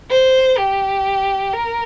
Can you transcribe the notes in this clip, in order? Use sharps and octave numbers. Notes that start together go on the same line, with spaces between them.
C5
G4
A#4